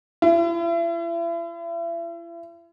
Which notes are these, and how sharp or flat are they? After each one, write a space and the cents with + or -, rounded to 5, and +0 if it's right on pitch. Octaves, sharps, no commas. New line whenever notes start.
E4 +40